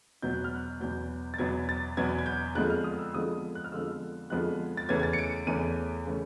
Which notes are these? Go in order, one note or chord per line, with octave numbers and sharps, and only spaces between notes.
E2 B2 F#3 B3 G6
F#6
F6
F#6
E2 B2 F#3 B3 G6
A6
E2 B2 F#3 B3 G#6
A6
E2 B2 F#3 B3 G#6
G#6
G6
F2 D3 F3 G#3 B3 F#6
F6
D#6
E6
F2 D3 F3 G#3 B3 D#6
F#6
F6
F2 D3 F3 G#3 B3 E6
F2 D3 F3 G#3 B3 F#6
A6
E2 C#3 E3 A3 C#4 G#6
G#6
A6
C#7
D7
E2 C#3 E3 A3 C#4 D#7
C#3 E3 A3 C#4